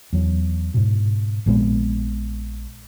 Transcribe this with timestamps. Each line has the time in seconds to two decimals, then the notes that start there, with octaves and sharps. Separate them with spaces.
0.13 E2 F#3
0.74 G#2 B2
1.46 A#1 A#2 G#3 B3